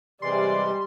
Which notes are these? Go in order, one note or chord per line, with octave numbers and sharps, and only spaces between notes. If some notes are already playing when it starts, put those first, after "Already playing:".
C3 E3 G3 G#3 D5 C6